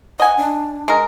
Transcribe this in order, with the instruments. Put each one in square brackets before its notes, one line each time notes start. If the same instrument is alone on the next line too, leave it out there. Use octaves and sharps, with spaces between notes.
[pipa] D#5 G#5 [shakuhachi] F#5
[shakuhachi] D4
[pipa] G#3 A#4